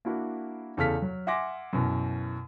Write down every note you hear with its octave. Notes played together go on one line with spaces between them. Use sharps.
A#3 D4 E4 F#4
E2 C#3 A4 F5 F6 B6
F#3
E5 F#5 G#5 C6 D6 A#6
F#2 B2 E3